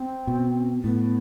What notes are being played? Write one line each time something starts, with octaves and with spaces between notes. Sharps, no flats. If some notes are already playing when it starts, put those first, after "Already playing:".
Already playing: C4
B2
A2 B3